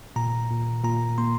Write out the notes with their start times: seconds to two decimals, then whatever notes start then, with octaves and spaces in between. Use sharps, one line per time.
0.16 A#2 A#5
0.50 A#2
0.84 A#2 A#5
1.18 A#3 C6